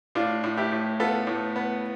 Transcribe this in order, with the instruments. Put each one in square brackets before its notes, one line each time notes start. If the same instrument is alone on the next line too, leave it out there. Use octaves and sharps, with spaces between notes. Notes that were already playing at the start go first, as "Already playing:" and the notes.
[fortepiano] A2 D4 F4
A2
E4 G4
A2
B3 F4 A4
A2
B3